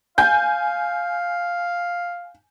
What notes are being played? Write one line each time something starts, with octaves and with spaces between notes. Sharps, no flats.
F5 G#5 G6